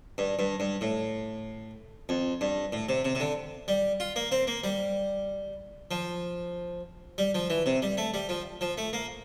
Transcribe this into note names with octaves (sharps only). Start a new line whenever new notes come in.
G2
G2
G2
A2
F2
G2
A2
C3
C3
C3
D3
G3
F4
A#3
C4
A#3
G3
F3
G3
F3
E3
C3
G3
A3
G3
F3
F3
A3
A#3